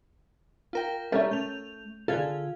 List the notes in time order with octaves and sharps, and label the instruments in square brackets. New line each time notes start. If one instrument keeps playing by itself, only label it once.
[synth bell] F4 A#4 G5
[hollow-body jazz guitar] G3 A#4 E5 [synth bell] C#4 A4
[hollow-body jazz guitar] A3 [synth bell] G6 F7
[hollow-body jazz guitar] D3 G#4 A4 [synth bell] F4 F5 G#6